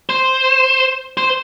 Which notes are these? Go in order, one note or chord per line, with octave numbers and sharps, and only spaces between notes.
C5
C5